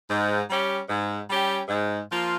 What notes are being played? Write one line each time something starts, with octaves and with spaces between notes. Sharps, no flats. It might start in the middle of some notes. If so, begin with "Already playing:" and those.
G#2
G3 C#4 G4
G#2
G3 C#4 G4
G#2
F3 A#3 F4